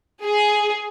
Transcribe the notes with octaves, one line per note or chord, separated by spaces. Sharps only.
G#4